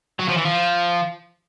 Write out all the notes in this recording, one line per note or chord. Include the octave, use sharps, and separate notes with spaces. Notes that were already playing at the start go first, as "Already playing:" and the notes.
F#3
F3
E3
F3